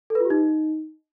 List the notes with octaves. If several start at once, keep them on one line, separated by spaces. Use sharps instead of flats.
A4
B4
F4
G4
D#4